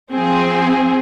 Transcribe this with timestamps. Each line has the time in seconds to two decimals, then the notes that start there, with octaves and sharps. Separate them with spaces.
0.11 F3 C4 G#4